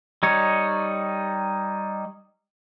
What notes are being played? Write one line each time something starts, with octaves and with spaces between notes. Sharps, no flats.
G3 D#4 C#5